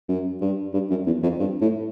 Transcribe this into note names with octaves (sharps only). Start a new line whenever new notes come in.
F#2
G2
G2
F#2
E2
F2
G2
A2